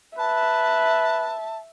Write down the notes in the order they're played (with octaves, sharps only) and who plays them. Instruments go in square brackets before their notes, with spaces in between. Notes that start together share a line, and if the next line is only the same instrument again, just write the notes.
[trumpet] B4 [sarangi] E5 [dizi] A5